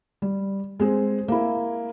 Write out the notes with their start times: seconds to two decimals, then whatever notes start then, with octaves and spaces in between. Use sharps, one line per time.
0.22 G3
0.80 G#3 C4 G#4
1.28 A#3 E4